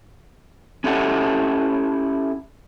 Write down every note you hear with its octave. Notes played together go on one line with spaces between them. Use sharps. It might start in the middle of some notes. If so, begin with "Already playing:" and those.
C#4 E4 G4 A4 F#5